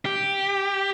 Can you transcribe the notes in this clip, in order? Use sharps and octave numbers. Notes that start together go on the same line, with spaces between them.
G4